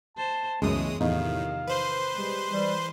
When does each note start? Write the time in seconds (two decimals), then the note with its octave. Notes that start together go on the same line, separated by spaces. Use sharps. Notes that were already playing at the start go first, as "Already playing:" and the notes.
0.17 C5 A5
0.62 C#2 F#2 B2 E3 G#3 A3 C#5 D#6
1.01 E2 A2 C3 D#3 F3 D#4 F5
1.68 B4 C5 C6
2.14 G3 G#3
2.52 E3 G3